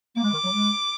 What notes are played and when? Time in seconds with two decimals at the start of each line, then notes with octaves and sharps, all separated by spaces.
0.17 A#3
0.22 G#3 D6
0.32 D#3
0.44 F#3
0.54 G#3